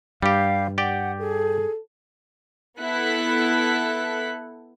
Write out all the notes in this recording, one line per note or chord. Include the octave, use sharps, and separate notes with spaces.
G2 G3 G4 F5
G4 D5 F#5 G5
G#4 A4
B3 E4 A4 F#6 B6